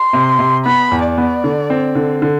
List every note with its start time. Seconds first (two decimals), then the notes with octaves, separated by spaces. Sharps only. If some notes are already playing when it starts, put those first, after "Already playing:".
Already playing: C6
0.13 C3
0.39 C3
0.65 B3 B5
0.92 E2
1.04 D5
1.18 B3
1.44 D3
1.70 C4
1.95 D3
2.22 D3